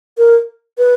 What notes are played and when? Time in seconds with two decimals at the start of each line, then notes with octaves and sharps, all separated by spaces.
0.18 A#4
0.78 B4